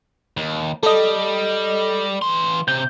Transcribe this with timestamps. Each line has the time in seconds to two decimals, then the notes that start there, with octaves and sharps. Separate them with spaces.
0.37 D#2
0.83 G3 A4 D#5
2.22 E3 C6
2.68 C3 G6